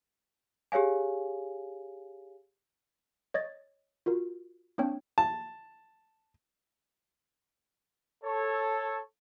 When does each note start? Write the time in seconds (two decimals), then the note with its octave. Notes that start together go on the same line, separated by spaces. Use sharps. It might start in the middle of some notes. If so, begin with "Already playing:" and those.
0.72 G4 G#4 C#5 F5 G#5
3.34 C#5 D#5 G#6 A6
4.06 F4 F#4 A#4
4.78 A#3 C4 D4 C#5 G5
5.18 A5
8.24 A4 C#5